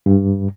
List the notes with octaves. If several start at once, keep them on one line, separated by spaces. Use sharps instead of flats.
G2